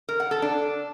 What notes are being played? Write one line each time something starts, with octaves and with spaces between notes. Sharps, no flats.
A#4
F#5
A4
D4